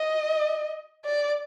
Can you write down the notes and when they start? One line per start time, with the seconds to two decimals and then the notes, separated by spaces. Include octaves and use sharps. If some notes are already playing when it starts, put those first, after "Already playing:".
Already playing: D#5
1.05 D5